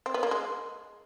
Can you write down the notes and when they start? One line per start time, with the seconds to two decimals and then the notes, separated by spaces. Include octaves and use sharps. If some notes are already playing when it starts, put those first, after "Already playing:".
0.06 C4
0.14 B3
0.23 A#3
0.31 G#3